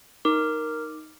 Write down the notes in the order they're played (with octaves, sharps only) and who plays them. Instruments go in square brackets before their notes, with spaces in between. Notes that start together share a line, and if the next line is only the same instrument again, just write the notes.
[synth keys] D#4 [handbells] A#4 [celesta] D6